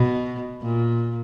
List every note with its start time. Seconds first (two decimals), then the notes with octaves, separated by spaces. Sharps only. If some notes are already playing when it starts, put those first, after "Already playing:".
Already playing: B2
0.61 A#2